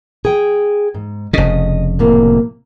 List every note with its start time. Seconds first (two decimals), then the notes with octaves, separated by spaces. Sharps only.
0.25 G#4 G5
0.94 G#2
1.33 F1 C#3 D#5
1.99 A2 C3 A#3